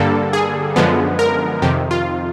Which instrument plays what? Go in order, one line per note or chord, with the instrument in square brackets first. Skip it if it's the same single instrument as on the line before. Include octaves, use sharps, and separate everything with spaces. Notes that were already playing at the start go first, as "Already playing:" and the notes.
Already playing: [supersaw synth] G2 D3 G3 A#3 A4
G#4
F#2 D3 F3 G#3 B3
A#4
F2 C3 D#3 G4
F4